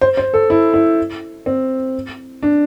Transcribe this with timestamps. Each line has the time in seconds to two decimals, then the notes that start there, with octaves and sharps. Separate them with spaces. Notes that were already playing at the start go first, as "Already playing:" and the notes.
0.01 C5
0.17 C5
0.34 A4
0.50 E4
0.74 E4
1.46 C4
2.43 D4